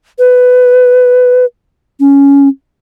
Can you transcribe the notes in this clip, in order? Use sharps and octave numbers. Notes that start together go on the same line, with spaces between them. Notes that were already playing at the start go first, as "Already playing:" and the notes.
B4
C#4